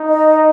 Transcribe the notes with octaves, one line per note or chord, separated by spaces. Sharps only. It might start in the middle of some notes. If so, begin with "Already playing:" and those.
Already playing: D#4
D#5